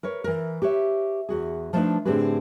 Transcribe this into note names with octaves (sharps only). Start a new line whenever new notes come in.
A#4 B4 C#5
E3 A#4
G4 B4 C#5 E5
E2 F#4 G#4
F3 A3 D4 D#4 F4 B4
A2 D3 C4 G4 G#4 B4